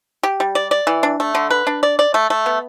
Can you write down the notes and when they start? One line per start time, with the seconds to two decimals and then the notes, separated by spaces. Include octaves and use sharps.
0.23 G4
0.40 G3
0.55 D5
0.71 D5
0.87 E3
1.03 D4
1.20 A3
1.35 D3
1.50 B4
1.67 D4
1.83 D5
1.99 D5
2.14 A3
2.30 A3
2.46 B3